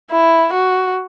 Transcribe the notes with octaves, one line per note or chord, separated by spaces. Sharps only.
E4
F#4